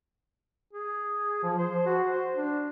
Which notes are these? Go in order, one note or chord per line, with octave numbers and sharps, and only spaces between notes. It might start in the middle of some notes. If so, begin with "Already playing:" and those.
G#4
F3
C5
F#4
C5
D4